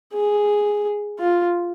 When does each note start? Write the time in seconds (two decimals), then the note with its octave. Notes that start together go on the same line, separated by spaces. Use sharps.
0.13 G#4
1.19 F4